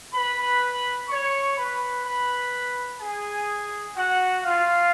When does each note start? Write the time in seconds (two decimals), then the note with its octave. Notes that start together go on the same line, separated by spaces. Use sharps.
0.13 B4 B5
1.09 C#5 C#6
1.57 B4 B5
2.05 B4 B5
3.00 G#4 G#5
3.96 F#4 F#5
4.44 F4 F5